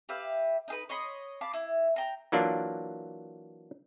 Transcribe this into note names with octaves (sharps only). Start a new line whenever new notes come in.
G4 B4 E5 F5
D#4 G#4 B4
C#5 D#5 B5 C6
F5 A5 B5 D6
E4
G5 A#5
E3 F#3 A#3 D4 F4